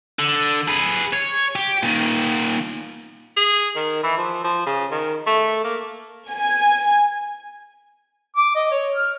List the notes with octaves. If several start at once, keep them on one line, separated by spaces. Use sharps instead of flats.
D3
G#4 B4
C#5
G4
A#2 D#3
G#4
D#3
E3
F3
F3
C#3
D#3
A3
A#3
G#5
D6
D#5
C#5
F6